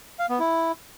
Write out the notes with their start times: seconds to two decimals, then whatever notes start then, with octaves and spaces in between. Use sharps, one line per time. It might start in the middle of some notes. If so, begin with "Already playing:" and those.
0.19 F5
0.29 B3
0.40 E4